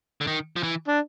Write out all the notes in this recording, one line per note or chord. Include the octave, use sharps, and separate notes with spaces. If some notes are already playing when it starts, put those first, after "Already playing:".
D3
D#3
F3
E3
D4